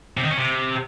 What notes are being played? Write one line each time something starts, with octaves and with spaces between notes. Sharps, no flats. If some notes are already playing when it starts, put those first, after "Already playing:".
C3
D#3
C#4
C3